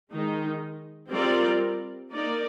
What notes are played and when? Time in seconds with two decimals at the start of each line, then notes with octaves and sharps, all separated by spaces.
0.12 D#3 G#3 D#4
1.10 G3 C4 F4 A#4 D5
2.11 A#3 D#4 A#4 D5